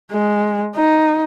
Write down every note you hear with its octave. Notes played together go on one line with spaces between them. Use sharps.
G#3
D#4